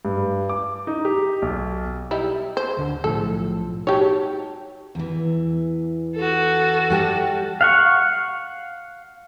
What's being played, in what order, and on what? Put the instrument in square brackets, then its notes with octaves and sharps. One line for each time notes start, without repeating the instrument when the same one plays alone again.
[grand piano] G2
D6
D#4
G4
B1
[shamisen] G3 D#4 E4
C5
[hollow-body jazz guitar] D2 D3
[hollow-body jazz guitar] B1 A2 F3 [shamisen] A4
[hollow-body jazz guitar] D#4 F#4 A5 [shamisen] G4 C#5
[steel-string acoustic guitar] E2 E3
[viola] F#4 A4
[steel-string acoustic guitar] G3 G4 A5
[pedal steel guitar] F5 F#5 C#6